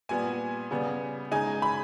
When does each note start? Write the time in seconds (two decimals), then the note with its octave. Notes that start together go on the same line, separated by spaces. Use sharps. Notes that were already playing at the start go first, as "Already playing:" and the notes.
0.09 A#2 G3 B3 G#5
0.71 C#3 G3 B3
1.31 C#3 G#3 D#4 G#5
1.62 B5